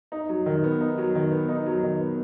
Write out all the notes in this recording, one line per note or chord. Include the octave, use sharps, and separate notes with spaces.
D#4
F#3
D#3
B3
D#4
F#3
D#3
B3
D#4
F#3
D#3
B3